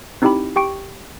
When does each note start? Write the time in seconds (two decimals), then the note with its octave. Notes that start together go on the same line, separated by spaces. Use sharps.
0.22 C4 D#4 E4 G4 G5 B5
0.56 G4 G5 C#6 D7